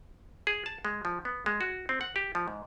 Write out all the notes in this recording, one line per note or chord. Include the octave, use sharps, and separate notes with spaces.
G#4
A5
G#3
F3
B3
G#3
F#4
C4
F#5
G4
F3
G#2